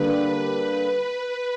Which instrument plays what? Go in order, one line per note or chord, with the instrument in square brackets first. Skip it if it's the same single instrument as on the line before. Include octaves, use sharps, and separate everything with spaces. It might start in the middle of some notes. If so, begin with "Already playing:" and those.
Already playing: [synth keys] D3 G3 A#3 D4 G4 [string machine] B4